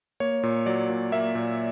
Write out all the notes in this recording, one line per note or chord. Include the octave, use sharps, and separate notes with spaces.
A#3 C#5
A#2
F#3 D5
A#2
A#3 E5
A#2